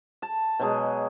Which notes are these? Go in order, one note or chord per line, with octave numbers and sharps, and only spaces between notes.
A5
B2 F#3 G#3 G#4